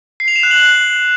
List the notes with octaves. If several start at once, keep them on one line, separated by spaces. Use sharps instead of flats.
C7
F7
E7
F#6
F#7